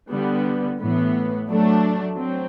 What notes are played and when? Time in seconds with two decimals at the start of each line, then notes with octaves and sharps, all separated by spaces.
0.11 D3 G3 B3
0.79 A2 E3 B3
1.47 F#3 A3 D4
2.16 F#3 C4